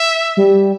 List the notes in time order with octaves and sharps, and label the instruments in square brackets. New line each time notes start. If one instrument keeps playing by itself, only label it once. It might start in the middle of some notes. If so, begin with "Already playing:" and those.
Already playing: [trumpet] E5
[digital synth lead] G3